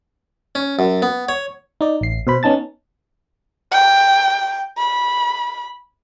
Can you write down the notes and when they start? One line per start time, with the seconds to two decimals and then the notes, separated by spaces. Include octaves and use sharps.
0.55 C#4
0.79 F#2
1.02 B3
1.29 C#5
1.81 D#4 D5
2.01 A1 C7
2.27 B2 C5 B5
2.43 B3 C#4 D#4 A5 A6
3.72 G5
4.78 B5